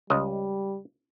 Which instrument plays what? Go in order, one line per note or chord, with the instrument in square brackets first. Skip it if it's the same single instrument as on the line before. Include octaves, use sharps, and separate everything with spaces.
[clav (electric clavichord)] C#2 D#5 [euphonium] G3